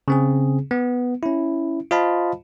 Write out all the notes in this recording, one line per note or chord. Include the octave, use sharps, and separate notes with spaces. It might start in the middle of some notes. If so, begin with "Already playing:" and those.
C#3 C4 G#4
B3
C#4 E4
F4 C5 D#5 F5 A5 B5